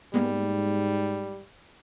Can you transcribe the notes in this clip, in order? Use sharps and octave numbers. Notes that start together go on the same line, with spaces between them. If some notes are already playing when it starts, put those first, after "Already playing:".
G#2 G3 G#3 A#3 B3